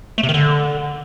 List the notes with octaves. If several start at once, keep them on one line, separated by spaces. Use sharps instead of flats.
A3
C3
D#3
D3